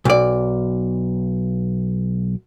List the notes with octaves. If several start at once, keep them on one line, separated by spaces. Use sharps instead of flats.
B1 D5